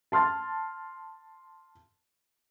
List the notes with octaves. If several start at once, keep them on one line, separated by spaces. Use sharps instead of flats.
A5 C6 F6 A6